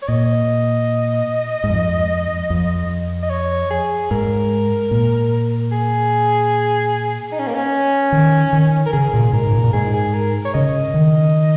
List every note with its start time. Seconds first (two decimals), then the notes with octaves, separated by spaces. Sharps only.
0.02 C#5
0.08 A#2 D#5
1.64 G#2
1.69 F2
2.50 F2
3.23 D#5
3.30 C#5
3.70 G#4
4.11 G#2 A#4
4.91 A#2
5.72 G#4
7.32 D#4
7.39 C#4
7.47 A#3
7.54 C#4
8.12 D#3
8.53 D#3
8.86 A#4
8.93 C#3 G#4
9.14 A#2
9.33 G#2 A#4
9.53 A#2
9.64 A#2
9.73 G#2 G#4
9.94 G#4
10.14 A#4
10.45 C#5
10.54 C#3 D#5
10.94 D#3